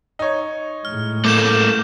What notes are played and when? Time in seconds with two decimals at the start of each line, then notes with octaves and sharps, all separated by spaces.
0.19 D#4 C#5
0.85 A2 G#3 F6
1.25 A3 A#3 D6 G6 E7